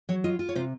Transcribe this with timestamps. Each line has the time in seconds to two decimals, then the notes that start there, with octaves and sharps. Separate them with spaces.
0.09 F#3 C#5
0.24 F4 D#5
0.39 F4
0.49 C#5
0.55 C3 C5